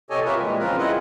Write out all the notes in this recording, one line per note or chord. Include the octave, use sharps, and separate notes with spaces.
C3 G4 A4 C#5 D#5 G#5
F4 G4 A#4 B4 C#5 E5
A#2 E3 G3 G#3
C#3 F3 C4 F4 A#4 B4
E4 F4 G#4 D#5 F#5